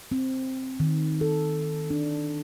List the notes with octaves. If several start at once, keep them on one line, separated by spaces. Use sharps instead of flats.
C4
D#3
A4
D4